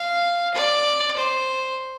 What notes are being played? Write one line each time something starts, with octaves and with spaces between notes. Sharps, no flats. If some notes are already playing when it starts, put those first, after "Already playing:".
Already playing: F5
D5
C5